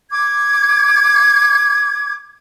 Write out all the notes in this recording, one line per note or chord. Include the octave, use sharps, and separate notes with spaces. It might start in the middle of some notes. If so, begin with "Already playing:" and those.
D6 G#6